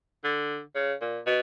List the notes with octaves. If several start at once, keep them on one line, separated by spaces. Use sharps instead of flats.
D3
C#3
A#2
B2